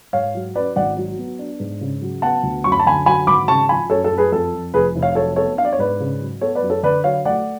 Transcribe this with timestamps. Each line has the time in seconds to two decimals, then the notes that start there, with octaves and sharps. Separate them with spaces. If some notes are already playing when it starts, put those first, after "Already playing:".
0.13 G#2 C#5 F5
0.35 F#3
0.55 C#4 B4 D5
0.76 G#1 D5 F#5
0.97 F#3
1.18 B3
1.39 D4
1.60 G#2
1.81 C#3
2.02 F#3
2.22 B3 F#5 A5
2.43 D2
2.64 F#2 C#6
2.72 B5
2.80 A5
2.86 D3 G#5 B5
3.06 F#3 G#5 B5
3.27 G#1 B5 D6
3.48 C#3 A5 C#6
3.69 F3 G#5 B5
3.90 F#2 A4 C#5
4.04 A4
4.11 F#2
4.18 G#4 B4
4.32 F2 A4
4.54 F3
4.73 F1 G#4 B4
4.96 F1
5.02 C#5 F5
5.15 F#3 A4 C#5
5.36 B3 A4 C#5
5.57 D4 F5
5.65 D5
5.73 C#5
5.79 G#2 B4 D5
6.00 C#3
6.20 F#3
6.41 B3 A4 C#5
6.55 B4 D5
6.62 F#2
6.70 A4 C#5
6.83 D3 B4 D5
7.04 F#3 C#5 F5
7.25 A3 D5 F#5